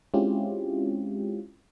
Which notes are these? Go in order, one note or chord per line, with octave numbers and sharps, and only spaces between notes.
G#3 C4 C#4 E4 F4 G4